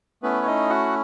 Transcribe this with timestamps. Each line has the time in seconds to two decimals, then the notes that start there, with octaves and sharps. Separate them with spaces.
0.23 A3 B3 C#4 E4 B4
0.42 C#5
0.46 D#4 D#5
0.70 F#4 F#5